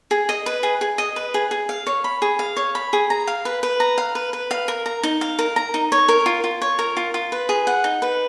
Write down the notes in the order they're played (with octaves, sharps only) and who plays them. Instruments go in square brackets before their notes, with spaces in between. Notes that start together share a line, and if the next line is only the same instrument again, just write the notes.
[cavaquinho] G#4
D#5
B4
G#4
G#4
D#5
B4
G#4
G#4
F5
C#5
B5
G#4
F5
C#5
B5
G#4
A#5
F5
B4
B4
A#5
F5
B4
B4
F5
A#4
A#5
D#4
F5
A#4
A#5
D#4
C#5
A#4
F4
F4
C#5
A#4
F4
F4
B4
G#4
F#5
D#4
B4